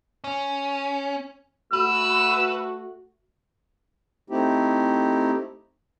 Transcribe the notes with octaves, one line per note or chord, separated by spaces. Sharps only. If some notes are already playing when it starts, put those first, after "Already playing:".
C#4
A3 F#4 B4 E6
A3 C4 D#4 E4 G4